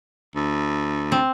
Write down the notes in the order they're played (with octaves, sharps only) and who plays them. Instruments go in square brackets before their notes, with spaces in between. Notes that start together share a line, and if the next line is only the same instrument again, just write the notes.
[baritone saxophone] D2
[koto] C4